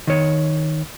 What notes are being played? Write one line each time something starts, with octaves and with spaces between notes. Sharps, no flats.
D#3 C#5